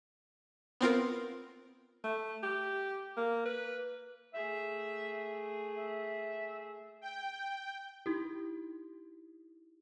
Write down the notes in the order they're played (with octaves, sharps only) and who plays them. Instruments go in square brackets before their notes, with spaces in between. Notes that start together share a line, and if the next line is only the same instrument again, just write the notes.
[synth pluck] B3 C4 F4 A#4
[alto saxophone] A3
G4
A#3
B4
[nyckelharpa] A3 G#4 [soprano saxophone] E5
[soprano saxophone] E5
[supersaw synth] G5
[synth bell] D#4 E4 G4